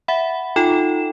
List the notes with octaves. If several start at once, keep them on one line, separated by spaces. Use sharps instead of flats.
E5 F#5 B5
D#4 F4 A4 G5 E7